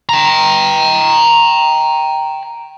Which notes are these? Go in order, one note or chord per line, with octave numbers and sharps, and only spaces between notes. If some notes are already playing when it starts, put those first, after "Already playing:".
G5 A#5